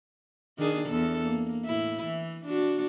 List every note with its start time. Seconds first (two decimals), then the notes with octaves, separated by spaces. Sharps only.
0.58 D#3 D4 G#4
0.89 E2 A4
1.23 A#3
1.65 A2 E4
2.04 E3
2.46 D4 F#4